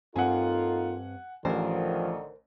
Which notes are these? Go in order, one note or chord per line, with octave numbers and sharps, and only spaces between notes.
G2 A#3 C4 D#4 F4 A4 F#5 G#5
A1 D3 D#3 F3 A#4 C5